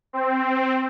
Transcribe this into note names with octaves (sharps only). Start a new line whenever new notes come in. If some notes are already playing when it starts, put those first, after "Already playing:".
C4